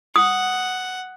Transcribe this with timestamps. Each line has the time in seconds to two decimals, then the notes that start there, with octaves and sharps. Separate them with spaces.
0.16 F#5 D#6